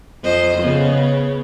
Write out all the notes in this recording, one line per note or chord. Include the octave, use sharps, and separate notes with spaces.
F2 C5 D#5
C#3 B3